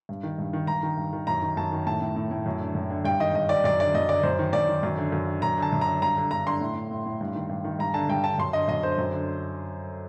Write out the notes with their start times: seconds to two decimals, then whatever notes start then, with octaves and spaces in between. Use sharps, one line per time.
0.09 G2
0.23 D#3
0.39 G2
0.53 D#3
0.67 G2 A#5
0.83 D#3
0.97 G2
1.13 D#3
1.27 F#2 A#5
1.42 D#3
1.57 F#2 A5
1.72 D#3
1.86 A2 A5
2.02 A2
2.16 A2
2.31 A2
2.46 F#2
2.60 D3
2.75 F#2
2.90 D3
3.05 G2 G5
3.20 D#3 D#5
3.34 G2 D#5
3.49 D#3 D5
3.64 F#2 D5
3.80 D3 D5
3.94 F#2 D#5
4.09 D3 D5
4.23 F#2 C5
4.39 D#3
4.53 F#2 D5
4.69 D#3
4.83 F#2
4.98 D3
5.12 F#2
5.27 D3
5.42 F#2 A#5
5.58 D3 A5
5.73 F#2
5.81 A#5
5.87 D3
6.02 G2 A#5
6.17 D3
6.31 G2 A#5
6.46 D3 C6
6.61 A2
6.75 A2
6.91 A2
7.06 A2
7.21 G2
7.35 D#3
7.50 G2
7.64 D#3
7.79 G2 A#5
7.94 D3 A5
8.09 G2 G5
8.24 D3 A5
8.38 F#2 C6
8.53 D3 D#5
8.68 F#2 D#5
8.83 D3 C5
8.98 F#2
9.13 D3